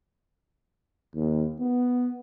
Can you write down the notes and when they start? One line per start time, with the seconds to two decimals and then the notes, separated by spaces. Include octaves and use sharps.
1.15 D#2
1.60 B3